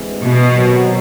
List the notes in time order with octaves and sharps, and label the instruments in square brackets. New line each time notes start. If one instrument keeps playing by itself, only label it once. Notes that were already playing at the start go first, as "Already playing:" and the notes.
Already playing: [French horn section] D2 C3 E3 G#3 B3
[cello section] B2
[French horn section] C3 D#3 F#3 B3